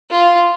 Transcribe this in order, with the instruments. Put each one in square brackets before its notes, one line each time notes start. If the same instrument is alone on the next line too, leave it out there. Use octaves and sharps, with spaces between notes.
[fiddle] F4